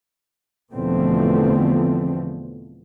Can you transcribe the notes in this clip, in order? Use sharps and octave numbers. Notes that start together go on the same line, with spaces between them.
E2 B2 D3 F3 A3 C4